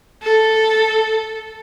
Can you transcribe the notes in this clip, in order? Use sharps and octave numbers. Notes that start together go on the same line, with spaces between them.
A4